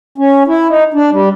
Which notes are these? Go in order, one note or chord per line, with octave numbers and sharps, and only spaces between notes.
C#4
E4
D#4
D4
G3